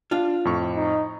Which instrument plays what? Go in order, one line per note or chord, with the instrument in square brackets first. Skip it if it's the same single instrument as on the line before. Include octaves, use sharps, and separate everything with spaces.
[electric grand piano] D4 [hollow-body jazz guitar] F4 F5
[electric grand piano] F2 A2 C#6
[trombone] D#4